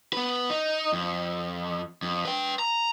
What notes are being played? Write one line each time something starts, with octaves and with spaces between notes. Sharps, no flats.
B3 B4
D#4
F2
F2
B4 G5
A#5